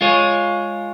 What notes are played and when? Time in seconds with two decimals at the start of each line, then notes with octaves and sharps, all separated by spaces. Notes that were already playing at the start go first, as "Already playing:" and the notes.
0.01 G#3 F4 G#4 C#5